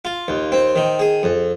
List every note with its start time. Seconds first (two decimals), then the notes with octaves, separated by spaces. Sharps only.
0.05 F4
0.28 D#2
0.52 C4
0.76 D#3
0.99 G#4
1.23 F2